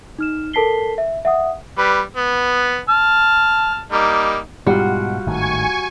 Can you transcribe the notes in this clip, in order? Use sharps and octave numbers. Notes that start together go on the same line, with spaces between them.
D#4 F6 E7
A4 A#4 A5 B6 C7 G7
E5
E5 F#5 D#6
G3 B4
B3
A5 F6
G3 A#3 D#4
G#2 B2 G3 F4 F#4
G#1 A2 D#3 G#5 C#6